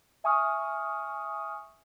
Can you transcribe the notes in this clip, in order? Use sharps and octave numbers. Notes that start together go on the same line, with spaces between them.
E5 G#5 C#6 D#6 F6